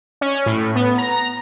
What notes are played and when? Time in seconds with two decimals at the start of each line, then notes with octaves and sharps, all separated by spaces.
0.21 C#4
0.46 A2
0.75 B3
0.98 A#5